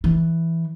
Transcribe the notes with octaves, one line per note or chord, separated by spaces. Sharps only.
E3